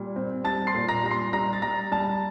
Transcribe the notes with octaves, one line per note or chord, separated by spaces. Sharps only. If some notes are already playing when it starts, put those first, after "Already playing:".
Already playing: A#2 G3
C4
G3 A5 A6
C6 C7
A#2
A#5 A#6
G3 A#6
C6 C7
G3 A#5 A#6
A6
G3 A#5 A#6
G3 A5 A6